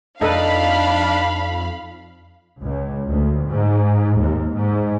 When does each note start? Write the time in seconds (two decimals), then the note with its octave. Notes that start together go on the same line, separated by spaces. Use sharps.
0.21 F2 D4 D#4 A4 B4 F5 B5
2.61 C#2
3.07 D2
3.47 G#2
4.20 D#2
4.55 G#2